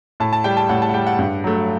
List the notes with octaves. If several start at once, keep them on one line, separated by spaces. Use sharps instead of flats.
A2 A5
A5
G3 G5
A5
A2 F#5
A5
F#5
G3 G5
F#5
G2
F#3 A3